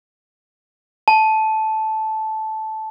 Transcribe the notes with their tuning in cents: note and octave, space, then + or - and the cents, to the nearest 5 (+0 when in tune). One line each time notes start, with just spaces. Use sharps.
A5 -10